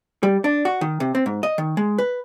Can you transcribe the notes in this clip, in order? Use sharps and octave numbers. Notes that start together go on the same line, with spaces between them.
G3
D4
F#4
D#3
C3
C4
G#2
D#5
D#3
G#3
B4